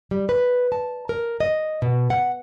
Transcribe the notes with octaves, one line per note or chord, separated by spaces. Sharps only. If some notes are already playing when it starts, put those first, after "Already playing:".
G3
B4
A5
A#4
D#5
B2
F#5